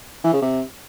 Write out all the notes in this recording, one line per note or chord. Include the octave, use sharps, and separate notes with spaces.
E3
C#3
C3